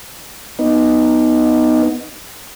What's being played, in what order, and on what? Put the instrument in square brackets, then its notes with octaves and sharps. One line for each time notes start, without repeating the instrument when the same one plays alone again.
[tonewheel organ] B3 D#4